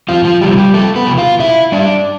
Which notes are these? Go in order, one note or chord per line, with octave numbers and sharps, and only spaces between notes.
F2 F3 F4
F3 F4
C3 F3 G3 G4
G3 G4
F2 A3 A4
B3 B4
C3 F3
F4 F5
B2 E4 E5
G3 D4 D5